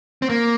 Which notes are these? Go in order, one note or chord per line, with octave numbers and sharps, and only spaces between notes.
C4
A#3